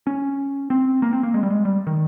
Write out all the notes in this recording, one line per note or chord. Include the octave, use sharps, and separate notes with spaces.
C#4
C4
A#3
C4
A#3
G#3
G3
G#3
G3
D#3